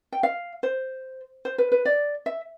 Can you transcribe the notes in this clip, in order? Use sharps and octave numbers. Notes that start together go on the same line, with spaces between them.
G5
F5
C5
C5
B4
B4
D5
E5